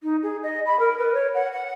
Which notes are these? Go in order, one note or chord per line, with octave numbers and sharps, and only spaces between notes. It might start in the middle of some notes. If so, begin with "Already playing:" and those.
D#4
G#4
D#5
B5
A#4
B4
C#5
F#5
F#5